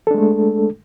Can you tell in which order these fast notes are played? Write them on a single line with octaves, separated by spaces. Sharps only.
A4 D4 G#3 A3